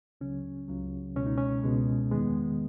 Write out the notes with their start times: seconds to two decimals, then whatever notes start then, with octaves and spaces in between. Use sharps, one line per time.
0.21 C#2 C#3 F#3 C#4
0.68 C#2 C#3 F#3
1.16 C#2 B2 G#3 C#4
1.26 D#4
1.37 C#4
1.64 C#2 B2 G#3
2.11 E2 D#3 G#3 B3